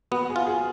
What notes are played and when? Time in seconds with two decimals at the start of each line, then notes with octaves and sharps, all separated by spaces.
0.11 B3 F#4
0.30 G#4
0.36 F4
0.47 G#4